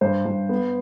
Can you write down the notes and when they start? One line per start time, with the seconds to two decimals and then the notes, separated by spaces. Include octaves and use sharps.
0.01 G2 C5
0.26 G2
0.49 B3